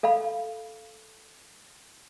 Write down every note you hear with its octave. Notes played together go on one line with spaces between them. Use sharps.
A4 F5 F#5 B5